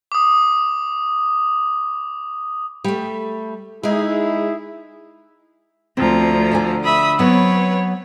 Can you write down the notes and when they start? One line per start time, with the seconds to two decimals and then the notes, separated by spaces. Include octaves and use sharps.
0.12 D6 D#6
2.84 G3 A3
3.83 G#3 D#4 E4 G#4
5.97 D2 F3 C4 A#5
6.52 D3 D5 G#5
6.84 E5 B5 D#6
7.19 F#3 B3 C4 B4 C#5